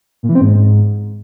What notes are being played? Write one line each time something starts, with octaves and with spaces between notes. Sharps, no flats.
A#2
E3
C4
G#2